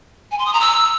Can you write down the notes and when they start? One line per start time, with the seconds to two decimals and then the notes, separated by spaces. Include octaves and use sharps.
0.31 G#5
0.39 C6
0.46 D#6
0.53 A#5
0.61 E6